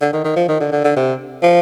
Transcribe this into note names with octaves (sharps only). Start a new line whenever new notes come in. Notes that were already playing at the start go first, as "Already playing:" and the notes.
D3
D#3
D#3
F3
D#3
D3
D3
D3
C3
F3